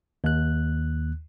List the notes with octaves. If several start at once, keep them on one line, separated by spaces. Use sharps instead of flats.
D#2 F#6